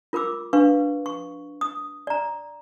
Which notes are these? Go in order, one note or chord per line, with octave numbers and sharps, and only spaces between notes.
F4 A#4 B5 D6 E6
D4 B4 F5 C#6
C#6
D#6
D5 A#5